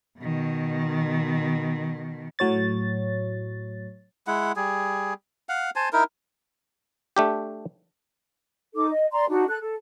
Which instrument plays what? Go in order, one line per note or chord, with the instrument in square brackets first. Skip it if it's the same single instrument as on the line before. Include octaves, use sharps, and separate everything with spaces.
[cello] B2 D#3
[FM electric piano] A2 F#3 C#5 A6
[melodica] G#3 E4 F#5
G3 G#4
F5 F#5
C5 G#5 A5
D#4 E4 A#4
[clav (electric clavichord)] A3 D4 G4
[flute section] D#4 A4 D6
D#5
D5 A#5 C6
D4 D#4 F#4
A4 F#6
A4